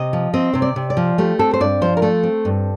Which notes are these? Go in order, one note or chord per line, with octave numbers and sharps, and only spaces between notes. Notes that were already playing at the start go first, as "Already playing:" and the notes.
Already playing: C3 D#5
F3
C4 D#5
C3 C5
D5
C3
D5
F3
A3 G4
C4 A4
C5
G2 D5
F3 C5
A#4
A3 A4
C4
G2